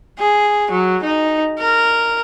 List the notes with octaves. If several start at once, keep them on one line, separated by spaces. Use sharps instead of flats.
G#4
F#3
D#4
A#4